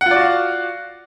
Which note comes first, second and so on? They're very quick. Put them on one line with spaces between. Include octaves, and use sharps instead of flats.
F#5 F4 D5 F#4 F5